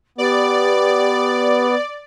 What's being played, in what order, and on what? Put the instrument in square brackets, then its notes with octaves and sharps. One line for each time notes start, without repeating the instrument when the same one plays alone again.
[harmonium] B3 [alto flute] G4 [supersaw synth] D5